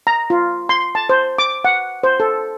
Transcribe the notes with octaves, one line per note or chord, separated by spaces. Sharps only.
A#5
F4
C6
A5
C5
D6
F#5
C5
A4